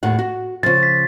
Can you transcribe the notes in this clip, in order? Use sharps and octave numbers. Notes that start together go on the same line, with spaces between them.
D#2 A2 F#5
F#4
C#3 F3 A6
B6